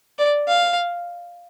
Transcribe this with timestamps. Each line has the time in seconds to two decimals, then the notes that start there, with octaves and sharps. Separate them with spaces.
0.19 D5
0.49 F5